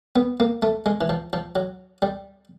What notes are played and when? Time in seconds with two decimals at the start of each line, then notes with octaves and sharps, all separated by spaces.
0.16 B3
0.40 A#3
0.62 A3
0.86 G#3
1.01 E3
1.09 F3
1.33 F3
1.56 F#3
2.02 G3